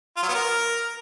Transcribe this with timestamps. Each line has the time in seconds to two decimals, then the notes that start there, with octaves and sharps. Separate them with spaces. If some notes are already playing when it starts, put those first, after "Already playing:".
0.17 F4
0.23 F#3
0.29 B3
0.35 A#4